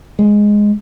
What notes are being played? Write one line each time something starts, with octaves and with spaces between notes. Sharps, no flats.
G#3